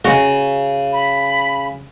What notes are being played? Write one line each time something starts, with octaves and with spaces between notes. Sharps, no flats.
C#3 F#4
B5